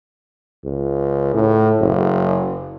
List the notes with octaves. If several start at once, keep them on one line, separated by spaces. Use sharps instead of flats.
C#2
A2
F#1